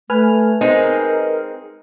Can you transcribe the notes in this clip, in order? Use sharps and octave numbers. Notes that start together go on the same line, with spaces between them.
A3 B4 G#5 F6
G#3 C4 D#4 A#4